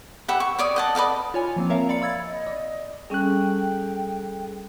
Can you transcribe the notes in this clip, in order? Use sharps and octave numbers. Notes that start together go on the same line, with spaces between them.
G4 B4 E5 F#5
C#6
C#5 D5 D#6
D#5 F#5 A5
B4 D5 D#5 F5
F4 C#5 G#5
F3 A#3 C4
A#4 C#5 E5 F5 A#5
D5 F5 B5 C#7
B5 E6 G#6 A6
D#5
D5
G3 C#4 G#4 A4 G5 F#6